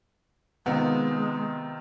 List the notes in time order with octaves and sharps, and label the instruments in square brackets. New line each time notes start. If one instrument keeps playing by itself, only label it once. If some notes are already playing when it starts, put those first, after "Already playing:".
[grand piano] C3 D#3 F4 [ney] G#3 [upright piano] B3